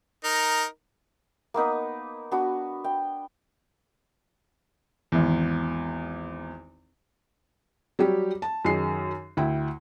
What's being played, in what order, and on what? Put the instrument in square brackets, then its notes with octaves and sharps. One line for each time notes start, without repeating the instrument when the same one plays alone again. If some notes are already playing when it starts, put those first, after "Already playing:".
[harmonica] D#4 A#4
[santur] A#3 B3 D#4 B4
B3 D4 F#4
G5
[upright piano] G#1 E2
[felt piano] F#3 G3 G4
A5
F#2 D#3 D#4 G#4 C7
D2 E4 G5